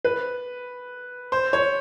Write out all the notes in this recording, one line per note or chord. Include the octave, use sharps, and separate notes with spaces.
B4
C5
C#5